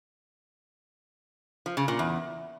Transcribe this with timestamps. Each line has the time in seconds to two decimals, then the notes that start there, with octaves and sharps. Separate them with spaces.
1.66 F3
1.77 C#3
1.88 A#2
1.99 E2